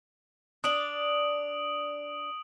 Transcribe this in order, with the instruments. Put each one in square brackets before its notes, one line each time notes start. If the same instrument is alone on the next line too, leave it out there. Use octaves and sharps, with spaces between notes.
[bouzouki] D4 D5 [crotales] D#6 D7 F#7